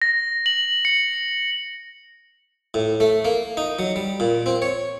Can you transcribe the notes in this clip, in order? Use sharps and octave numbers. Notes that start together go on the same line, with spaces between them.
A#6
F#7
C#7
A2
A3
A#3
D#4
F#3
G3
A#2
C4
C#5